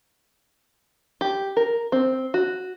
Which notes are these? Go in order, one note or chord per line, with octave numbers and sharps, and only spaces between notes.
G4
A#4
C4
F#4